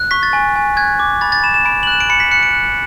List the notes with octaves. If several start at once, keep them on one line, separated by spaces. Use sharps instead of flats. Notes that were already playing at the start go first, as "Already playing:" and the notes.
Already playing: F#6
C#6 B6
A6
G#5
G#5
F#6 G#6
D6
B5 A6
A6
B5 E7
E7
B5 D7
F#7
F#6 E7
D7
B5 C#7
B6
F#6 C#7
D7
F#6